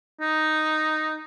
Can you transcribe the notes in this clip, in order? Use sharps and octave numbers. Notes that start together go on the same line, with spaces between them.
D#4